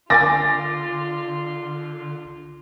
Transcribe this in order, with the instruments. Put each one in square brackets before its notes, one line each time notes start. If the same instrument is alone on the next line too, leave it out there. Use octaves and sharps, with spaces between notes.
[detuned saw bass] D3 [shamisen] A#3 D4 G#5 [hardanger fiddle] F4 [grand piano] D6 A6 A#6